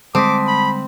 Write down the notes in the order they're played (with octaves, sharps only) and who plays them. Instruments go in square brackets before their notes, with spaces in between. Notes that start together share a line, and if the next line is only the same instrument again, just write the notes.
[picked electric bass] D3 G3 G#3 [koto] C4 [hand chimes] A5 D#6 B6 [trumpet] D6
[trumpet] B5